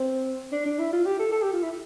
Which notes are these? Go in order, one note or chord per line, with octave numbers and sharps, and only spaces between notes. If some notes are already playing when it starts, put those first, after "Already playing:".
Already playing: C4
D4
D4
E4
F4
G4
A4
A4
G4
F4
E4